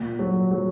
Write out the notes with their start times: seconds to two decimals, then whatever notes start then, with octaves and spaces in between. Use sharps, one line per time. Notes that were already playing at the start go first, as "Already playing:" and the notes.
Already playing: A#2
0.19 F#3
0.51 F#3